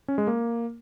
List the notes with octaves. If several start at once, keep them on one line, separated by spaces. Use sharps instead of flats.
C#4
G#3
A#3